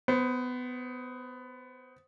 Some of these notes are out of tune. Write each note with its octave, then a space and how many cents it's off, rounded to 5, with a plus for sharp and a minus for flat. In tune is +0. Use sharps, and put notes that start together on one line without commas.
B3 +20 C5 +0